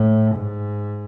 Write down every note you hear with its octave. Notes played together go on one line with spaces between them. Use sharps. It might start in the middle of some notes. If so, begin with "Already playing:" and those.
Already playing: A2
G#2